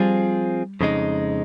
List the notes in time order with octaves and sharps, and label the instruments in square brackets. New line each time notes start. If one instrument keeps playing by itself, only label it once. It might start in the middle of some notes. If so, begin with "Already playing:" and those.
Already playing: [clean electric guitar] F3 C4 F4 G#4 [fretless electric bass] G3
[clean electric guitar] F2 C#3 G#3 D#4